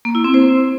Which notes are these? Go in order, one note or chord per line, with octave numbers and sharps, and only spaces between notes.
A#3
E4
C4
C5